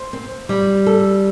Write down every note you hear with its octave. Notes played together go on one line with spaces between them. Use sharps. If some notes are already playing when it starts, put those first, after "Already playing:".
Already playing: C5
C4
G3
A4